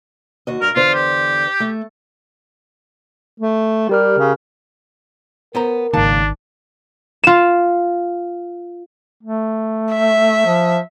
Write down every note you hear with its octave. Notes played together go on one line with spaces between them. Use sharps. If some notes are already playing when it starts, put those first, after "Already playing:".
D#2 F#4 D#5
G2 A#4
E2 D3 F4 C5
G4
A3
A3
G3 G4 A#4 F6
C#3
B3 A#4 C5 A#5
G#1 C#2 D#3 A#3 D4 A5
F4 E7
A3
E5
F3